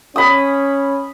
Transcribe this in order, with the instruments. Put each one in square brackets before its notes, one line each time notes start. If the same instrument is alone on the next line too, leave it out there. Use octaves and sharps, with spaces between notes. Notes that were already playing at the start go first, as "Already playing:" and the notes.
[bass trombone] C#4 [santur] B5 D#6